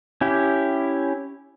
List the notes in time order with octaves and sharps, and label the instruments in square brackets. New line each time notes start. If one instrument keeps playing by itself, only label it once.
[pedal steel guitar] C#4 E4 G4